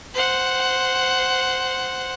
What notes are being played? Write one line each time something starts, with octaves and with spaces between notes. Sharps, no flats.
C5 F#5